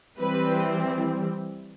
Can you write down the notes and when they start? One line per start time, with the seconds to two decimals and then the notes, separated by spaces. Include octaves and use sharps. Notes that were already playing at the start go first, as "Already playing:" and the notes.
0.18 E3 G3 C4 B4